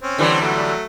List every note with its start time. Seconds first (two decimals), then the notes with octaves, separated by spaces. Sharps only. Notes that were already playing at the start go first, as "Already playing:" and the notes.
0.03 C4 C#4
0.18 D3 E3 G3
0.41 F#3 A3